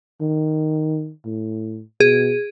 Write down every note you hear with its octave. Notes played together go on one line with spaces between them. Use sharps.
D#3
A2
B2 G#4